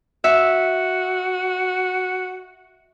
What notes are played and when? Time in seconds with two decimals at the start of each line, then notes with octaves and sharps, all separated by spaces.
0.24 F#4 E5